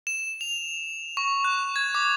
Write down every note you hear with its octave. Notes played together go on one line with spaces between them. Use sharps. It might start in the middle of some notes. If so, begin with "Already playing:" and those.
E7
F7
C#6
F#6
G#6
D6